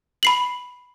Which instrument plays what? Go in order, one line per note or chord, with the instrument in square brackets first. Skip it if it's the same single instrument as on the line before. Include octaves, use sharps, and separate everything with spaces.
[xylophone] B5 C7 F#7